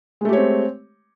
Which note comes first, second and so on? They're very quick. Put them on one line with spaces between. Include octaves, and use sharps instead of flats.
G#3 A3 G4 C#5 C4